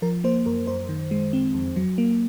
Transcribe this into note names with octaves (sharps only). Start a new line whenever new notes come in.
F3 A#4
A#3 C5
F#2 A#4
F#2 C5
D#3
G#3
C4
F2
F#3
A#3